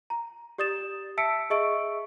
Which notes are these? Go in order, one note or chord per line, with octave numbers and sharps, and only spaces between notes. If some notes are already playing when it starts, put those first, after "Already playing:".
A#5
G4 D5 D#6 A6 E7
E5 A5 E6 B6 C#7 D7
G#4 D#5 E5 C#6 E6 D7